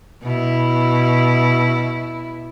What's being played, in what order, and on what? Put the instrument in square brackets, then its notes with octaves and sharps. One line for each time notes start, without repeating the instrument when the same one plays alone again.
[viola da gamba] B2 E4